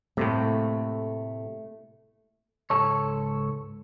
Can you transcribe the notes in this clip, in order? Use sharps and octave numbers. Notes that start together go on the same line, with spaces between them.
A2 C3 A3 A#3
C#2 G#2 A4 C#5